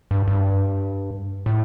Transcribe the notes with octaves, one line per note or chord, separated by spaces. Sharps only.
G2
G2
A2